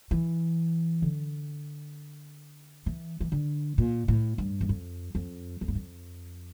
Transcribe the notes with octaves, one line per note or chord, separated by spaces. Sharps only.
E3
D3
E3
E3
D3
A#2
A2
G2
E2
F2
F2
F2
G2
F2